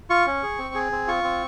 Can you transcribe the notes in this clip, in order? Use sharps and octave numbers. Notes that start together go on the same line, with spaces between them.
F4 C#6
C#4
G#4
C4
G#4
C4
F4 C#6
C4